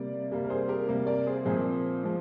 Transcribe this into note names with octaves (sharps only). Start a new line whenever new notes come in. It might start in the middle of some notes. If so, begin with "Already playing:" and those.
Already playing: C3 G3 A#3 D5
C3 G3 A#3
A#4
G#4 C5
G4 A#4
C3 G3 A#3
A#4 D5
G#4 C5
A#2 F3 G#3 C4 G#4 C5
F3 G#3 C4